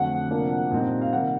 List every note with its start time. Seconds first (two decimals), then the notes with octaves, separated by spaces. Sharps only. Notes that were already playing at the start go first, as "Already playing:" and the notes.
Already playing: F2 D3 F#3 A3 F#5
0.31 C3 F3 A#3 D4
0.71 A#2 G3 C4 D#4
1.02 F5
1.13 C3 D#3 G3 A#3 F#5